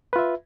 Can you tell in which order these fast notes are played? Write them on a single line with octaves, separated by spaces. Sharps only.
B4 F4 E5